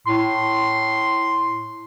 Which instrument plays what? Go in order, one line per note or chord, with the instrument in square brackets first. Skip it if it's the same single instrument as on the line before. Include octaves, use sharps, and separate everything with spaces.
[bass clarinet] A2 [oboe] C6